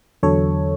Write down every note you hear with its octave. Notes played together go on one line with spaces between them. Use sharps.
E2 D3 F#3 A4 C#5